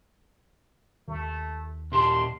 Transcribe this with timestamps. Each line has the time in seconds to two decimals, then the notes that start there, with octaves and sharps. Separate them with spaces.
1.08 D#2 A3
1.92 A#2 G4 A5 C6